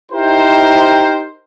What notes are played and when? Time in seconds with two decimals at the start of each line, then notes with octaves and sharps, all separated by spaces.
0.12 D#4 E4 G4 A#4 C5